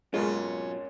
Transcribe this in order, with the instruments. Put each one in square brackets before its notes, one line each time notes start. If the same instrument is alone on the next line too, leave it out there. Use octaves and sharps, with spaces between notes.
[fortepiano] F2 G#2 A#3 [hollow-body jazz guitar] B2 F#3 F4 [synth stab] G#3 [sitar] C#4